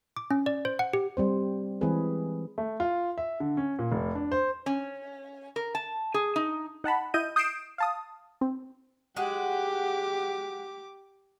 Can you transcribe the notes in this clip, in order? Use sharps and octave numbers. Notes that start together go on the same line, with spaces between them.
D6
C#4
D5
C5
F#5
G4
G3 C4 C5
E3 G#3 C4 G#4 B4
A3
F4
E5
D3
C#4
A#2
F1
D4
C5
C#4
A#4
A5
G#4
D#4
D#4 F#5 A5 B5
E4 D#5 G6 D#7
D#6 G6 C7 D7 E7
F5 A5 D#6
C4
G#3 F#4 G4 D6